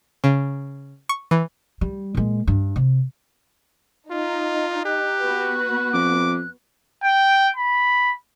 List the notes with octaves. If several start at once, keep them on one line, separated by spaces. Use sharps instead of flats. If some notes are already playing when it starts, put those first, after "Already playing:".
C#3
C#6
E3
G3
A#2 G#3
G2
C3
D#4 F4
G4 F#6
B3 F#4 B4
F2 D6
G5
B5